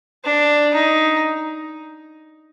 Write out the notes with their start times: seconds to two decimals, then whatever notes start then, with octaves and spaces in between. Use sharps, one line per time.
0.24 D4
0.74 D#4